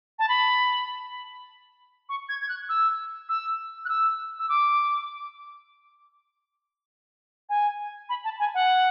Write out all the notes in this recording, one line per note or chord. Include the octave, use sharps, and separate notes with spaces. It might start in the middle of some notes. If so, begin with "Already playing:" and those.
A5
B5
C#6
G#6
G#6
F#6
E6
E6
F#6
E6
E6
D6
G#5
B5
A5
G#5
F#5